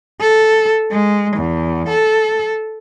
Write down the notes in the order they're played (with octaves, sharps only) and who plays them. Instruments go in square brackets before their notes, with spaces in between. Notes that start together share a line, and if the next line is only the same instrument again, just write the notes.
[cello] A4
G#3
E2
A4